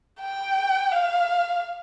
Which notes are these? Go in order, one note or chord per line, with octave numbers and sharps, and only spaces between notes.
G5
F5